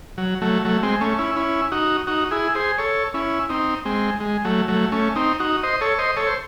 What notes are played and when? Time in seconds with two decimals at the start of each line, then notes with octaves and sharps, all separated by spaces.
0.18 F#3
0.42 F#3 A3
0.65 F#3 A3
0.83 G#3 C4
1.01 A3 C#4
1.18 C#4 E4
1.36 C#4 E4
1.72 D#4 F#4
2.07 D#4 F#4
2.31 E4 G#4
2.55 G#4 C5
2.78 A4 C#5
3.14 C#4 E4
3.49 C4 D#4
3.85 G#3 C4
4.21 G#3
4.45 F#3 A3
4.68 F#3 A3
4.92 A3 C#4
5.16 C4 D#4
5.40 D#4 F#4
5.63 C5 D#5
5.81 A4 C#5
5.99 C5 D#5
6.17 A4 C#5
6.27 C5